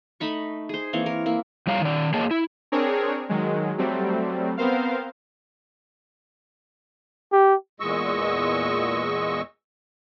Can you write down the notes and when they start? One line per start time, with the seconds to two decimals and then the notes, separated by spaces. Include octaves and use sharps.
0.20 A3 D#4 B5 C#6
0.69 G#4 C5
0.93 E3 A#3 C4 C#5
1.06 A#4
1.26 A#3 E4
1.67 F2 G3 C#5 F5 A#5
1.81 D#3 D5
2.14 A#3 G#4 C#5 D#5 A5
2.31 E4
2.72 C4 D4 G#4 A#4 C#5
3.29 D#3 F#3 G#3
3.78 F#3 G3 A3 C4
4.57 B3 C4 A#4 C5 F5
7.32 G4
7.80 E2 A#2 G#3 D#5 C#6 E6